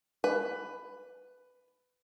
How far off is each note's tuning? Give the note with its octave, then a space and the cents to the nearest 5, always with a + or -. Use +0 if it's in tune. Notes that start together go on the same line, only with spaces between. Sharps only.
B4 +15